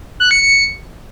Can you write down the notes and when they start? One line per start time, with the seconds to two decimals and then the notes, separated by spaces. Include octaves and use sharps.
0.20 F#6
0.31 C#7
0.42 C#7